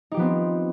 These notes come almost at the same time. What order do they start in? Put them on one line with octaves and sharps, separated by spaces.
D#4 G4 F3 B3 C4